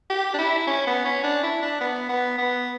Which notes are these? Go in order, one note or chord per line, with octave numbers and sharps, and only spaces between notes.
G4
D4
E4
C#4
B3
C#4
D4
E4
D4
B3
B3
B3